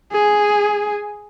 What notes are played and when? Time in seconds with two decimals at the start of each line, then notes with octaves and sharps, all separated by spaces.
0.13 G#4